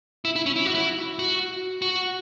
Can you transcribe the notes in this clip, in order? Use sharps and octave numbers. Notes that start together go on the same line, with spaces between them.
E4
E4
C#4
E4
F#4
E4
F#4
F#4